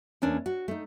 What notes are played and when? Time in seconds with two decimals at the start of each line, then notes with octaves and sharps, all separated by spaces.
0.22 E2 A#3 C#4 D4
0.46 F#4
0.68 A3 D#4